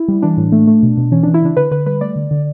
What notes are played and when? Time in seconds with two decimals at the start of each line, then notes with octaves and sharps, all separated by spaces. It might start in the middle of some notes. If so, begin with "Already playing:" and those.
Already playing: E4
0.08 G3
0.22 E3 D4
0.37 A2
0.52 A3
0.67 A3
0.83 B2
0.97 B2
1.12 E3 C#4
1.23 E3 D4
1.34 E4
1.42 C#3 D4
1.57 D3 B4
1.71 D3 B4
1.86 G3 B4
2.01 A3 D5
2.16 D3
2.31 D3